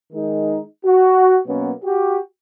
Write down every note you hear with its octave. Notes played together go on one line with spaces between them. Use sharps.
D#3 G#3 D#4
F#4
B2 F#3 A#3 B3 C#4
F#4 G4